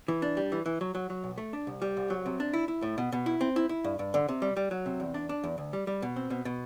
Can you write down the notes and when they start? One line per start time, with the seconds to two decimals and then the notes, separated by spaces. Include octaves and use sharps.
0.08 E3
0.22 D4
0.37 G3
0.52 E3
0.66 E3
0.81 F#3
0.95 F#3
1.10 F#3
1.24 B1
1.38 A3
1.53 D4
1.67 C2
1.82 G3
1.97 C2
2.10 F#3
2.26 C3
2.40 D4
2.54 E4
2.68 E4
2.82 A2
2.98 B2
3.12 B2
3.26 E4
3.41 C4
3.56 E4
3.69 E4
3.84 G2
3.99 G2
4.14 D3
4.28 C3
4.42 G3
4.57 G3
4.71 F#3
4.86 C3
5.00 E2
5.14 D4
5.29 D4
5.44 E2
5.58 D2
5.73 G3
5.87 G3
6.02 B2
6.16 C4
6.30 B2
6.45 B2